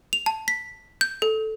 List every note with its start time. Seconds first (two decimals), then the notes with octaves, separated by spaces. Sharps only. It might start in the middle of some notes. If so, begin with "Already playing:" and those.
0.13 F7
0.26 A5
0.48 B6
1.01 G6
1.22 A4